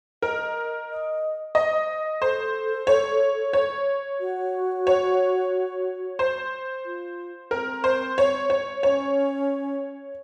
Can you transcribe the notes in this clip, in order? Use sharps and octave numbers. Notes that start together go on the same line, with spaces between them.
A#4 D#5
D#5
C5 D#5
A4 C5
C#5
C#5
F#4
C#5
C5
F4
C4 A#4
C5
C#5
C#5
C#4 C#5